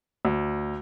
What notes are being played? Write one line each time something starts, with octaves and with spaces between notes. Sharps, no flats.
D2